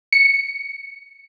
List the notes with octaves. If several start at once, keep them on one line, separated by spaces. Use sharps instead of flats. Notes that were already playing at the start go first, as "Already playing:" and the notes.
C#7